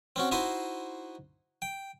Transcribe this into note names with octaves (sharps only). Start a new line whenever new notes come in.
C4 C#4 F#4
D#4 E4 F#4 C5 D#5 C6
G5